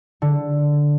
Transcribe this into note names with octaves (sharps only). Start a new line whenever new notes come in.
D3